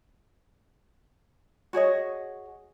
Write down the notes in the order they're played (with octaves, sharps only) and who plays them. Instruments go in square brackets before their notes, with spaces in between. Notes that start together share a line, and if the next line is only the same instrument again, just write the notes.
[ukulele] F#4 G#4 C#5 D#5